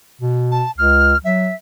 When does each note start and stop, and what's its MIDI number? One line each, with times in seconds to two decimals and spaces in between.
0.21 0.63 47
0.51 0.71 81
0.78 1.14 37
0.78 1.18 89
1.25 1.49 54
1.25 1.55 76